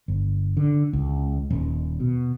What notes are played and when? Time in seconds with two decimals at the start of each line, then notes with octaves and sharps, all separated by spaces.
0.08 G1
0.57 D3
0.93 C#2
1.50 D#1
2.00 B2